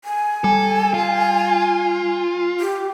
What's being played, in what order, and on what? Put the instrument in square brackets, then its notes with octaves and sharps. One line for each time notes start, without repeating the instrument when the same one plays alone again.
[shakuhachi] G#5
[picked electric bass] G3 [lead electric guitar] A4
[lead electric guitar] F4
[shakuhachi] G4